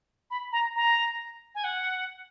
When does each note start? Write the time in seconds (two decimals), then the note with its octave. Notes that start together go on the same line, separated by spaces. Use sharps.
0.31 B5
0.52 A#5
0.76 A#5
1.55 G#5
1.64 F#5